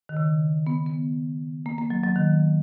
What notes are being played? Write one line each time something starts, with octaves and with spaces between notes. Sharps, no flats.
D#3
C#3
B3
B3
A#3
A#3
F#3
F#3
D#3